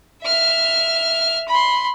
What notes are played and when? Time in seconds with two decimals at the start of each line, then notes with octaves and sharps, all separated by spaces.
0.23 E5 F6
1.48 B5 C6